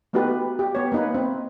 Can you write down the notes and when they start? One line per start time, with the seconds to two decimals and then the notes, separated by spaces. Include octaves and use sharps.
0.13 A3 B3 D#4 F#4 G4 B4
0.59 G4
0.75 B3 C#5
0.92 A#3 D#4 B4
1.14 C4